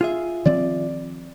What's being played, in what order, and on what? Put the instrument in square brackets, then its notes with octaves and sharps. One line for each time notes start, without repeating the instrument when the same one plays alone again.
[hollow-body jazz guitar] F4 G#4 E5
[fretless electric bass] D#3 F3 C4 [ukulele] D5